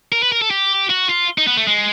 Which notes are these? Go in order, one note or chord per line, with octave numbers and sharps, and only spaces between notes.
A#4
B4
A#4
A4
G4
F#4
F4
D#4
B3
A3
G#3